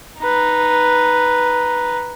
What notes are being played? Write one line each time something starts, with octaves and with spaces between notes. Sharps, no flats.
D#4 B4